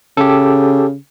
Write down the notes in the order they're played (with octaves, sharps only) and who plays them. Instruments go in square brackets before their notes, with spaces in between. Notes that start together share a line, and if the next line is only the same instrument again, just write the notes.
[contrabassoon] C#3 [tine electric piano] G4 A4